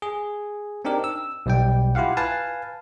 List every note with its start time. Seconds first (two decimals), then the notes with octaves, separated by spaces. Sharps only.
0.02 G#4
0.85 C4 D4 D#4 G4 A#4
1.04 E6
1.46 B1 G3 G5
1.95 E4 F4 G4 F5 F#5
2.17 B4 F5 G#5 A5